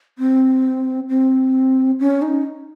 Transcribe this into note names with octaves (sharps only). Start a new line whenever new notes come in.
C4
C4
C#4
D#4